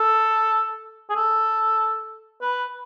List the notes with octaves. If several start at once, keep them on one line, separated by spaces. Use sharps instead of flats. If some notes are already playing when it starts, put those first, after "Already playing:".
Already playing: A4
G#4
A4
B4